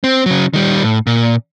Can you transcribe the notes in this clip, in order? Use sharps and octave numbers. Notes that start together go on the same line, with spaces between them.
C4
C#3 F#3
D#3 G3
A2
A#2